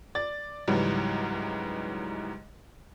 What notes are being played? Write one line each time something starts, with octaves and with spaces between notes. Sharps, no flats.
D5 A6
C#2 G#2 E3 F#3 G3